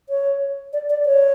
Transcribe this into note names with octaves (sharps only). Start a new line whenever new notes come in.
C#5
D5
D5
C#5